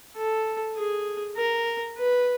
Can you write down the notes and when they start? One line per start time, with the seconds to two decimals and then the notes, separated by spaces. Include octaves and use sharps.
0.17 A4
0.77 G#4
1.37 A#4
1.98 B4